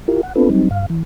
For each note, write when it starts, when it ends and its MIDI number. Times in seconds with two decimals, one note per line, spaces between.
0.08 0.22 64
0.08 0.22 65
0.08 0.22 67
0.08 0.22 70
0.23 0.33 78
0.36 0.49 59
0.36 0.49 60
0.36 0.49 62
0.36 0.49 65
0.36 0.49 69
0.36 0.49 71
0.50 0.69 54
0.50 0.69 55
0.50 0.69 60
0.50 0.69 63
0.71 0.86 43
0.71 0.86 77
0.90 1.03 52